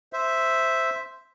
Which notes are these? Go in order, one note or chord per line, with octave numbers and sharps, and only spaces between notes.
C5 E5